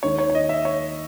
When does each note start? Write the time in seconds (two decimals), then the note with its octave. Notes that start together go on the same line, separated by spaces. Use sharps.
0.03 D#2 D#3 G#3 C#5
0.19 C#5
0.30 C#5
0.35 D#5
0.49 E5
0.65 C#5